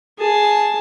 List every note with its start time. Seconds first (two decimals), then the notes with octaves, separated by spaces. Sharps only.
0.18 G#4 A5